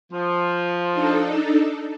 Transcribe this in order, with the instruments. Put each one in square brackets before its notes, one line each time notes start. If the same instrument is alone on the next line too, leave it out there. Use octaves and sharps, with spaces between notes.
[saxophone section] F3
[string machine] D4 D#4 A4